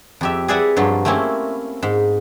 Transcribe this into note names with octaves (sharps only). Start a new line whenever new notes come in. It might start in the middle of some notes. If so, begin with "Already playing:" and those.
F2 G4 E5
G#4 B4 D5 E5 F#5 G#5
G2 F3 F#3
A3 A#3 C4 C#4 E4
G#2